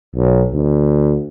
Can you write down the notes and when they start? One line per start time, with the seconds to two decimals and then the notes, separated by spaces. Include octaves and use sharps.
0.16 B1
0.53 D2